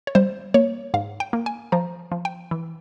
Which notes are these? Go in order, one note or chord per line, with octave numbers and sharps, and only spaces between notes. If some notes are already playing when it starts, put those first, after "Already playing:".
C#5
G3 C5
A#3 C#5
G#2 F5
G5
A#3
G#5
F3 A#5
F3
G5
E3